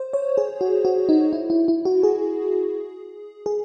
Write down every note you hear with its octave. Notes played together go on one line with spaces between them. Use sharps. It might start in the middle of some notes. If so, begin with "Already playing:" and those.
Already playing: C5
C#5
G#4
F#4
F#4
D#4
E4
E4
E4
F#4
G#4
G#4